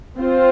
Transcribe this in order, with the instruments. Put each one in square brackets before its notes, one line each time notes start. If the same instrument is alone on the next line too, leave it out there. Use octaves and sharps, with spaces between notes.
[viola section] C4 F4 C5